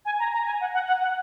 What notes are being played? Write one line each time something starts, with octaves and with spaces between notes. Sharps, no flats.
G#5
A#5
A#5
G#5
F#5
F#5
F#5
F#5